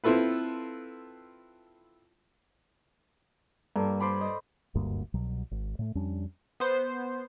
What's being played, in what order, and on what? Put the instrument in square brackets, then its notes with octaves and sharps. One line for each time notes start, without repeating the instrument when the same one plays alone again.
[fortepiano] C4 E4 F4 A4 B4
[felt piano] G2 [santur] A#3 A4
[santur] C5 D5 B5
D#5
[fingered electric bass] F#1 D2 G2 A#3
C2 B2 F#3
G#1
A2 A3
F2 G3 C#4 D4
[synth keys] B3 C5